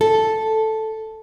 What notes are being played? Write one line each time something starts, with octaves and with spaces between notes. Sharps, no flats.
A4